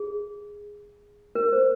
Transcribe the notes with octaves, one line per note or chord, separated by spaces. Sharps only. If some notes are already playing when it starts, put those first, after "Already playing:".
Already playing: G#4
A#4
C5